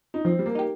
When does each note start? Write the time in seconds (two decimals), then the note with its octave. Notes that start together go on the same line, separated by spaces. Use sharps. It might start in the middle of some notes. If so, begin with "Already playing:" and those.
0.14 D#4
0.25 F3 C4
0.39 G3
0.46 A#3
0.55 D#4 G4